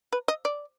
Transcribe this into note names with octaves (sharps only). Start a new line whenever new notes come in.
B4
D#5
D5